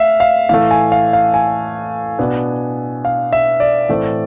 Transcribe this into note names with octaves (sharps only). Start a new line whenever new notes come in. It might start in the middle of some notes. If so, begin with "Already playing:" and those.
Already playing: A3 E5 F5
F5
A2 E3 A3 F5
G#5
F5
F5
G#5
B2 B3 D4
F5
E5
D5
A2 E3 A3 C4